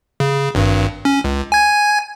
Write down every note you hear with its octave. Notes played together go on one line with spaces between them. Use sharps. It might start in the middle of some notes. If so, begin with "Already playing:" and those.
C#3
G#1 G2
C#4
C#2
G#5 G#6